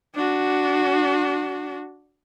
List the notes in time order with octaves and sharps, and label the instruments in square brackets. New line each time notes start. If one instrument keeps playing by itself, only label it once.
[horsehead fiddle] D4 F#4